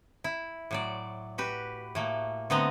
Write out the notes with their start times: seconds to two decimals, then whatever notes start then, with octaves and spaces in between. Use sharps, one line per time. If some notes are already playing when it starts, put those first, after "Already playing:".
0.24 E4
0.71 A2 F#3 D5
1.38 F#4 G4 B4
1.95 A2 A3 A#3
2.50 D3 A3 B3 C4 D#5 A#5